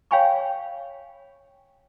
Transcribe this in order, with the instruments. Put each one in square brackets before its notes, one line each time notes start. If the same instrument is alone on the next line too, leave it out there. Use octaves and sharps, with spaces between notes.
[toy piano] C#5 F5 G5 G#5 B5 C#6